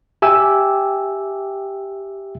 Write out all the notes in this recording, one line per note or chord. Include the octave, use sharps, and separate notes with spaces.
G4 E5 G5 G#5 D6 E6